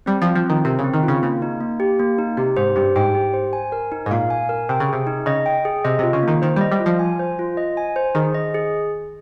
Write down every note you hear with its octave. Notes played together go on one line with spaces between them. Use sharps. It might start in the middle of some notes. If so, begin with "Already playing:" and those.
G3 C4
F3 F4
F3
D#3 C4
C3 A#4
C#3
C4
D#3
F4
C#3
C#3 A#3
D#4
A#3
G4
A#3
D#4
C3 G4
G#2 C5
G2 G4
G#2 G5
G4
C5
G#5
A#4
D#4
G#2
A#2 F5
G#5
A#4
C3 G5
C#3
C3 G#4
D#4
C#3 D#5
G5
G#4
C3 D#5
C3 F4
C#3
D#3 A#3
D#3 C5
G3 D#5
G3
F4
F3
G#5
C5
F4
D#5
G#5
C5
D#3 G#4
D#5
G#4